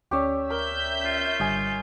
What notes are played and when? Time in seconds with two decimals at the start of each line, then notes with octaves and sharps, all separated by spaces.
0.11 D2 C#4 G4 C#5 D5 E5
0.50 A#4 E5 G6
1.05 F4
1.40 G#1 D3 G3 D#5 G#5